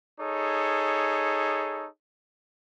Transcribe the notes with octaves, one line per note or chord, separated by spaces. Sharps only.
D#4 G#4 A4 C#5